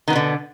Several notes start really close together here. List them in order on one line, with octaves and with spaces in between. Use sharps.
D#3 B3 B2 D3